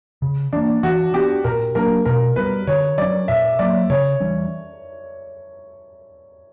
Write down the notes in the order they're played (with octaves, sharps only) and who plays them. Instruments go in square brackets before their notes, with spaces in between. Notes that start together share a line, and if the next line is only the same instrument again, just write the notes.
[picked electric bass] C#3
[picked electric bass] E3 A#3 [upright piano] D4
[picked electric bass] E3 [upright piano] F#4
[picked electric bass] B3 D4 [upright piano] G4
[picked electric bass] A#2 [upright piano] A#4
[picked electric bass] F#3 A#3 D4 [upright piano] A#4
[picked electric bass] B2 [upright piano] A#4
[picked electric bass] G3 B3 [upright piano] B4
[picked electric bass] D3 [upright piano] C#5
[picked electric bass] F#3 C#4 [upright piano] D5
[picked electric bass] A#2 [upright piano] E5
[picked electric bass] F#3 A#3 [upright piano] D5
[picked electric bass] C#3 [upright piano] C#5
[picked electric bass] E3 G3 C#4